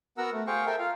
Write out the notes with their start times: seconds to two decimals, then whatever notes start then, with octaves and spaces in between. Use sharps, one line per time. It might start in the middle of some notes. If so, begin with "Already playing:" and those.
0.18 B3 F#4 A#4 F#5 A#5 E6
0.33 A3
0.47 G#4 C5 F5 G5 C#6
0.66 A4 A#4 E5 G5
0.79 F4 F5